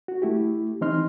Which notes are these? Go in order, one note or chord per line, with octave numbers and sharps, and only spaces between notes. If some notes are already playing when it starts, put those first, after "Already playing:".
F#4
A3 E4 G4
E3 C4 D#4 D#5 C6 F6